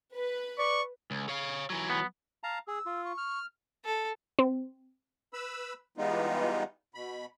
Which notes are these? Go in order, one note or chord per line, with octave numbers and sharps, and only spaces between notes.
B4
D5 C#6
C#2
C#5 F5
E3 F#3
B3
F5 A5 A#5
G#4 E6
F4
C#6
F6
A4
C4
B4 B5 E6
E3 G3 G#3 B3 D#4 F4
B2 B5